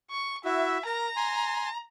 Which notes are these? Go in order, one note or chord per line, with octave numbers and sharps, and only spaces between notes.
C#6
E4 F#4 E5
A#4 A#5
G#5 C6